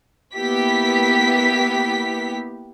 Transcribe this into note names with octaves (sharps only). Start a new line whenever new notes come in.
A#3 B3 E4 G4 B6